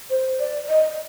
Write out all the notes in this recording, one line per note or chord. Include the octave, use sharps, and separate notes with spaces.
C5
D5
D#5